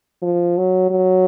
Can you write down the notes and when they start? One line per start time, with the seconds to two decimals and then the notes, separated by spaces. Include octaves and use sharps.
0.22 F3
0.57 F#3
0.90 F#3